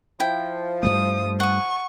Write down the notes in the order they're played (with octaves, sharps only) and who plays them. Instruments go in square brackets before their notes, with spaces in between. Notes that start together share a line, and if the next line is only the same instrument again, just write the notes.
[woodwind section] F3 [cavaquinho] E4 G5
[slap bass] G2 G3 A3 [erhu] D#6
[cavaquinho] F#5 D#6 [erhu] C#6